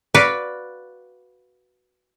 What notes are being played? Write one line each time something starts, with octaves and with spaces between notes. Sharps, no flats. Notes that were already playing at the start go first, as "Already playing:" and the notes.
F#4 B4 D5 F5